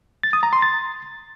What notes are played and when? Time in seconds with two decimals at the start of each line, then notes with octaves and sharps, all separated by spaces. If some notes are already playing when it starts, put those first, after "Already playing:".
0.23 A6
0.33 D#6
0.43 A#5
0.53 C6
0.62 A6